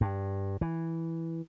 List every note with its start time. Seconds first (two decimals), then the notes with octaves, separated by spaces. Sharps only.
0.01 G2
0.61 E3